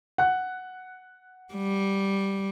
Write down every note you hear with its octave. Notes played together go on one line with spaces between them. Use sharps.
F#5 F#6
G3